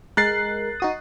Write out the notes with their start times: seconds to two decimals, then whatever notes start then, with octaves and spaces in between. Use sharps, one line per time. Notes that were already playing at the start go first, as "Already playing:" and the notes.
0.17 G#3 A#4 F#6 A6 C7
0.80 D#4 F#4 D#6